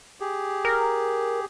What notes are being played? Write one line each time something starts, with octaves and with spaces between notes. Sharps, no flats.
G4 G#4
A#4